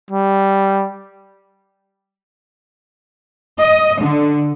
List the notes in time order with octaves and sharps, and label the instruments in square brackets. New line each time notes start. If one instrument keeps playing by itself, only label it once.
[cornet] G3
[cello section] D#5
D3